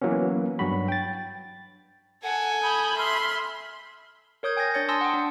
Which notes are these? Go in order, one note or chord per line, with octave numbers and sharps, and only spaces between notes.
E3 F#3 A#3 B3 C#4
G2 F#3 F#4 B5
G5 A6
A4 F#5 G#5
B5 D#6 G6
E5 B5 C6 F6
A#4 C#5 D#6 G6 G#6
G5 G#5 G6 G#6 A#6
D4 C#5 A6 C#7
G#5 A5 C6 D#6 E6 A#6
F#5 G5
D4